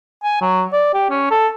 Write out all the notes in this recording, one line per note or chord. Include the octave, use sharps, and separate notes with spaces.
G#5
F#3
D5
G4
C#4
A4